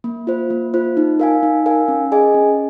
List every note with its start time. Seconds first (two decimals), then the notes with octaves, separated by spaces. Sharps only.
0.04 A#3
0.27 F4 C5
0.50 A#3
0.74 F4 C5
0.97 D#4
1.20 A#4 F5 G#5
1.43 D#4
1.66 A#4 F5 G#5
1.88 C#4
2.12 G#4 D#5 G#5
2.35 C#4